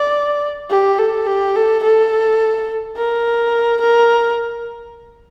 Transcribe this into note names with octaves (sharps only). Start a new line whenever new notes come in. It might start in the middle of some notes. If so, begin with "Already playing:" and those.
Already playing: D5
G4
A4
G4
A4
A4
A#4
A#4